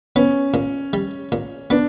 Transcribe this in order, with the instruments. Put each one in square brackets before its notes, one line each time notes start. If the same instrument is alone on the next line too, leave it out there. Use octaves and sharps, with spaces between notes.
[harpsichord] B3 [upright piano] C#4
[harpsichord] A#2
G3
A#2
[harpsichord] B3 [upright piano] D4